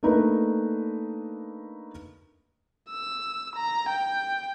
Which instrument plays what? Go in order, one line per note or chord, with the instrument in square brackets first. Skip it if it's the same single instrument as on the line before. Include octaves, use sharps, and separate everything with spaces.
[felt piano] A3 A#3 D4 D#4 A#4 B4
[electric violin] E6
A#5
G5